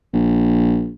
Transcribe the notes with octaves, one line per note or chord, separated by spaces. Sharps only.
A#1